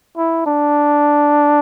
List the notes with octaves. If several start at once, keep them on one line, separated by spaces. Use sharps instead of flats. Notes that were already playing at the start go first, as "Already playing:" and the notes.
E4
D4